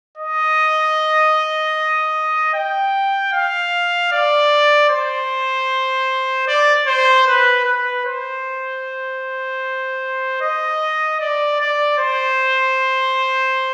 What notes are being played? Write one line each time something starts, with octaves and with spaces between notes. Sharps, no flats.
D#5
G5
F5
D5
C5
D5
C5
B4
B4
C5
D#5
D5
D5
C5